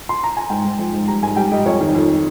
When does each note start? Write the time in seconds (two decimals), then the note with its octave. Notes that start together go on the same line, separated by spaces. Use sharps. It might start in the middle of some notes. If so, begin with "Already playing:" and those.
0.09 C6
0.24 A#5
0.37 G#5
0.50 G#2 G5
0.65 G#2
0.79 F3
0.93 G#2
1.08 G3 A#5
1.22 G#2 G#5
1.36 G3 G5
1.52 G3 D#5
1.66 F2 C#5
1.81 D#3
1.95 F2